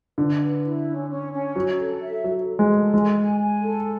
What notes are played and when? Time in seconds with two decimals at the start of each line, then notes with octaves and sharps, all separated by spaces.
0.18 D3 B4
0.41 B4
0.63 E4
0.87 C#4
1.10 C#4
1.32 C#4
1.56 F#3 C#5
1.79 A4
2.02 E5
2.24 F#3 A4
2.48 A4
2.59 G#3
2.71 A4
2.93 G#3 G#5
3.17 G#5
3.39 G#5
3.62 A4